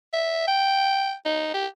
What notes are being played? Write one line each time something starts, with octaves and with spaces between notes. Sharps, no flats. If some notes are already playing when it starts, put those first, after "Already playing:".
E5
G5
D#4
G4